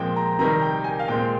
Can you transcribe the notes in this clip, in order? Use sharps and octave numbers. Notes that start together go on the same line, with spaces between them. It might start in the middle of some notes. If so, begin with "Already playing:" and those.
Already playing: A#2 F3 G#3 C4 G5
A#5
C3 D#3 G3 A#5
G5
G#5
F5
A#2 G#3 C4 G5